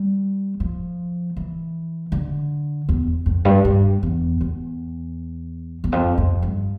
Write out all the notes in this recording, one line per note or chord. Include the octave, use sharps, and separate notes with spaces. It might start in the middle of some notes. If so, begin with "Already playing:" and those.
Already playing: G3
F3
E3
D3
E2
F2
G2
G2
E2
E2
E2
F2
F2
G2